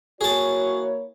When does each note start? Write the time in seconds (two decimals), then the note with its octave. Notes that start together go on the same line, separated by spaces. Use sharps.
0.21 A#3 E4 F#4 G#4 C#5 A5